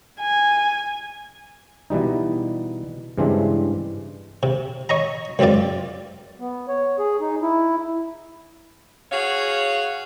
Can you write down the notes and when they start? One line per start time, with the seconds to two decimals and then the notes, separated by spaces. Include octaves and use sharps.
0.20 G#5
1.90 B2 E3 G3 D#4
3.18 G2 C#3 E3 G#3 C4 D4
4.43 C3
4.89 C#5 D#5 A#5
5.39 C#2 F#2 C4 F4 D5
6.40 B3
6.68 C#5
6.99 G#4
7.21 D#4
7.42 E4
9.11 F#4 G#4 C#5 F5